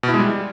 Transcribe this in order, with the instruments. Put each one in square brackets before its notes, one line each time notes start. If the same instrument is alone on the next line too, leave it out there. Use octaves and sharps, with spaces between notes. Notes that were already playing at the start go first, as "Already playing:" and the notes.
[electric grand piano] B2
E4
G#3
G3